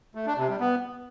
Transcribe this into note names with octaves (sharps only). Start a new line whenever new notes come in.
A3
D4
C3
G3
B3